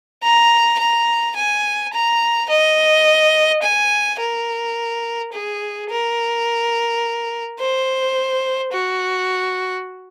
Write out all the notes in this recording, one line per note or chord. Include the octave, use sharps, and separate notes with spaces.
A#5
A#5
G#5
A#5
D#5
G#5
A#4
G#4
A#4
C5
F#4